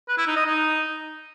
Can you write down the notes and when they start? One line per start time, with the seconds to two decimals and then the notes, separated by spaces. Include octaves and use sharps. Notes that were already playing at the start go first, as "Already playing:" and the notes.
0.08 B4
0.18 E4
0.27 D#4
0.36 D#5
0.45 D#4